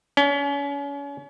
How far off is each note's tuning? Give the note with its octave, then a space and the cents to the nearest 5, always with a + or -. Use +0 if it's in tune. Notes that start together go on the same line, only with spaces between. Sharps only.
C#4 +35